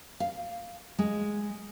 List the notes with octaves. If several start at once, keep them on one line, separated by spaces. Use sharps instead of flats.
F5
G#3